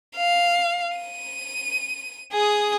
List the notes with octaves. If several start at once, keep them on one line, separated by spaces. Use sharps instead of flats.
F5
D#7
G#4 D#6